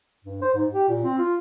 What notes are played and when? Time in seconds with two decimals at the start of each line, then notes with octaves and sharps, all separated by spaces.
0.24 G2
0.42 C5
0.54 G#2
0.73 G4
0.89 A#2
1.04 C4
1.18 F4